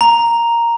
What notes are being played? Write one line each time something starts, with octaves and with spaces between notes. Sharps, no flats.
A#5